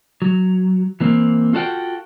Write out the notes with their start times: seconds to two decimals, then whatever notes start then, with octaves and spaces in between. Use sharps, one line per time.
0.22 F#3
1.00 E3 A#3 C4
1.53 F4 F#4 A4 C5 F#5 G5